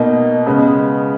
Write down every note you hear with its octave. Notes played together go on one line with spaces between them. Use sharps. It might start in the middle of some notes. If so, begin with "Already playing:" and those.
Already playing: B2 A#3 D#4
C#3 G#3 B3